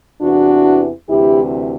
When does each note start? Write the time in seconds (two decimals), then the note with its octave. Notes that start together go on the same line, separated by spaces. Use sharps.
0.21 E2 C3 E3 D4 F#4
1.09 D2 C3 E3 E4 G4